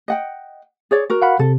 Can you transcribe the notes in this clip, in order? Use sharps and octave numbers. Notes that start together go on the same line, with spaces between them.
D#5 F#5 G5
G#4 C#5 D5
F#4 A#4
F5 F#5 B5
C3 A4